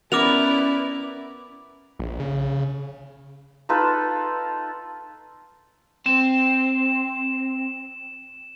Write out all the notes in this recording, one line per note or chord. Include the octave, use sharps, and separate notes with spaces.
B3 C#4 E4 A#4 B4 D5 D6 F7
A#1
C#3
D#4 F4 A4 B4
C4 E7